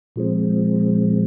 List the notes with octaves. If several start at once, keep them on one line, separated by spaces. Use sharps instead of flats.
A#2 F3 G#3 C4